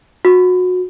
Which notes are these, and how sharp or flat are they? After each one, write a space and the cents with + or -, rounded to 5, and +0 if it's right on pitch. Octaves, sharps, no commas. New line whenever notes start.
F#4 -25